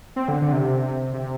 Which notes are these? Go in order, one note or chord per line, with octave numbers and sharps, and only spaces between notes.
C4
D3
D3
C3
C3